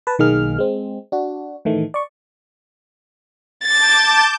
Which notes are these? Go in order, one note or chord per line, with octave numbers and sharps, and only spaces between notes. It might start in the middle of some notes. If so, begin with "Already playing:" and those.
B4 A5
B1 D#3 A#3 G#4 F6
G#3 C4
D4 F#4
A2 D#3 E3 A3
D5 C#6
A5 D6 G6 A6